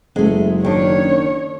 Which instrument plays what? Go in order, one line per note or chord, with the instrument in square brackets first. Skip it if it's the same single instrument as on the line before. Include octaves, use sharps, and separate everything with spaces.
[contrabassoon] F#1 [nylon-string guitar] G#3 A3
[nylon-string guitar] D#3 D4 [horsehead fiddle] C#5